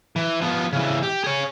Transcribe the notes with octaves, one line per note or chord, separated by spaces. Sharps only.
E3
F3 B3
C#3 E3
G4
G#4 C#5